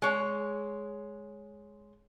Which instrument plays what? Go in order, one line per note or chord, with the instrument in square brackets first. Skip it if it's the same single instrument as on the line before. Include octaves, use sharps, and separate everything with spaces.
[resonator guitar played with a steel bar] G#3 C#5